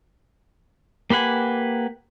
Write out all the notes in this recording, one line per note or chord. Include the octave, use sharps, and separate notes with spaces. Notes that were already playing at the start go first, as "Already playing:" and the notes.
A#3 G4 B4 F#5 G#5